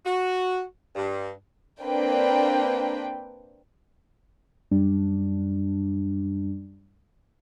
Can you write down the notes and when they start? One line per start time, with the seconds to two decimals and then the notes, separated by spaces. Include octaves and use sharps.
0.05 F#4
0.96 G2
1.82 A#3 C4 D4 B4 G5
4.71 F#2 G3 D4